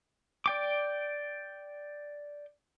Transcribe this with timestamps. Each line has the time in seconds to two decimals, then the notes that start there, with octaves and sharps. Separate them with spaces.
0.46 D5 G5 D6